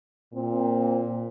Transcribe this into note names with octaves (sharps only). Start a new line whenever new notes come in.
A#2 C4